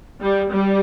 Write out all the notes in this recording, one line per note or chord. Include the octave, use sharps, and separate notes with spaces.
G3
G3